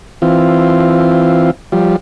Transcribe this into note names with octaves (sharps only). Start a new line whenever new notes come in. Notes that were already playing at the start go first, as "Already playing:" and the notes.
E3 C4 F4
F3 G3